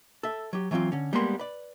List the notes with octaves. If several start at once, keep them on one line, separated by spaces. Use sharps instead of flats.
A4 E5
F#3 G4
E3 F#3 G3 C4 F4
D3 C#4
G3 G#3 A#3 B3 A#4 C6
B4 D5